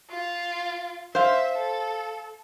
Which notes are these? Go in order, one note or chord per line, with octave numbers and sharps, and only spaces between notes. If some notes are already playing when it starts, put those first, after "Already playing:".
F4
C5 E5 F5
A4